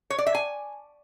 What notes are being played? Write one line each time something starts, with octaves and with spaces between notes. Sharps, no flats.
C#5
D5
E5
G#5